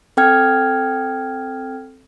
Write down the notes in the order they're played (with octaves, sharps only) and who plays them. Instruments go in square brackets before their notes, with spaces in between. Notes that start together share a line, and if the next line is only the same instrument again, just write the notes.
[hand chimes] C4 A4 G5 F6 G#6